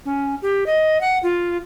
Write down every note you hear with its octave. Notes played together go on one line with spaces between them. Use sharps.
C#4
G4
D#5
F#5
F4